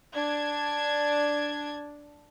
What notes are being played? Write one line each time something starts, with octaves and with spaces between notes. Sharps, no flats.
D4 G#6